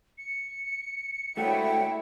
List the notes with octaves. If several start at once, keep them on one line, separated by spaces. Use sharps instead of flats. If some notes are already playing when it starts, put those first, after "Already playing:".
C#7
G#3 A3 E4 F#4 C#5 G5